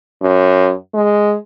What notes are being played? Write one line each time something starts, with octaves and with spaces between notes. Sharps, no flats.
F#2
G#3